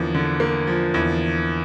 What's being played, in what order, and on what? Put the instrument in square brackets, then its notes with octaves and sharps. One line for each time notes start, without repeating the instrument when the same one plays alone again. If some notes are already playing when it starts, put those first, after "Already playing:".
Already playing: [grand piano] E2 D3 F3 A#3
D3
A#3
F3
E2